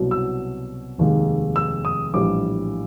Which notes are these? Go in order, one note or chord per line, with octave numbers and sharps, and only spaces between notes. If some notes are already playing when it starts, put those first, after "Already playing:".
Already playing: C2 B2 F#3
E6
F1 D#2 D#3 G#3
E6
D#6
A#1 A2 E3 G3 D6